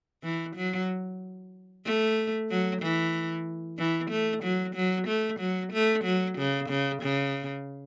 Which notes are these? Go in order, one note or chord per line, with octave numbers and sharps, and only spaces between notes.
E3
F#3
A3
F#3
E3
E3
A3
F#3
F#3
A3
F#3
A3
F#3
C#3
C#3
C#3